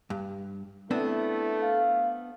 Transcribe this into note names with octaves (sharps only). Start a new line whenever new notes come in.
G2
A3 B3 C4 D4 E4
F5